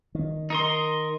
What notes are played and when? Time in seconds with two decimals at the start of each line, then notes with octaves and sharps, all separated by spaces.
0.15 D#3
0.50 D#4 A#4 C6